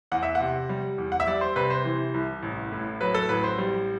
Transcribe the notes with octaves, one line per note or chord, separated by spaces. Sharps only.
E2 F#5
E5
F#5
C3
G3
E2
F#5
E5
G3 D5
C5
C3 B4
C5
E3
C2
A1
A2
F#3 B4
A4
A1 B4
C5
G3